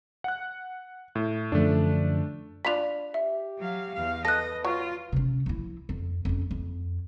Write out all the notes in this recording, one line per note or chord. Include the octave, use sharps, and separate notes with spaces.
F#5 F#6
A2
F#2 D3 F3 A3 D4
D4 F4 B5 B6 F7
G4 E5
F#3 F5
E2 F5
A4 B4 D#5 F#6 A#6
F#3 F4 C#6
C3 C#4
F3 E4
F2
F2 C#4
F2